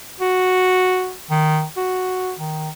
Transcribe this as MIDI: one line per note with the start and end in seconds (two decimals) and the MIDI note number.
0.20 1.13 66
1.31 1.65 51
1.77 2.33 66
2.39 2.69 51